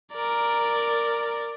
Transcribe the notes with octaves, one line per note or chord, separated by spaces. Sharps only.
A#4 D5